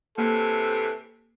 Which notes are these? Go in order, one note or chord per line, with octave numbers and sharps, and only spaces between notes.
A2 C3 E3 A#3 A4